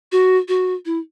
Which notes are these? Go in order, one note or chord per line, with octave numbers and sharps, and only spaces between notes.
F#4
F#4
E4